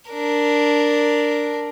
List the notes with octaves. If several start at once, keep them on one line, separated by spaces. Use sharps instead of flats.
D4 A#4